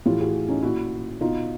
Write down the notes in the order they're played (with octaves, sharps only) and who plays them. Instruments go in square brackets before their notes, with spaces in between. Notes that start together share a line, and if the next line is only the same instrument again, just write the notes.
[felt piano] A2 E3 F4 G4
F#4 G#4
C#4 D#4
A#2 E4 F#4
B2 D#4 F4